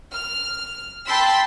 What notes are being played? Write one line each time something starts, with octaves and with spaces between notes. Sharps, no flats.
F6
G5 A5 B5 C6 E6 B6